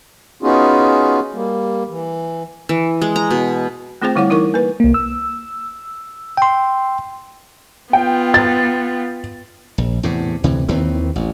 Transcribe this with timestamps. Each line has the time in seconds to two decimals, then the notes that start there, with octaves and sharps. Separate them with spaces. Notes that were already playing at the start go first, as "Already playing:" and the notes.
0.43 B3 C#4 D#4 F4 F#4 G#4
1.33 G3 A#3
1.89 E3
2.69 E3
3.02 G#3
3.16 A#5
3.31 B2
4.02 A3 C4 F4 G#4 C5 G5
4.16 D3 G3 E4 C#5 F#5 D6
4.30 E3 D#4 E4 A#4 C#6
4.54 A#3 B4
4.80 C2 A#3
4.94 E6
6.37 G5 C6
7.93 B3 F4 G5
8.34 A6
9.78 A#1
10.03 E2 A2 C3
10.44 D2 C3 E3
10.68 D#2 D#3 E3 C4
11.16 A1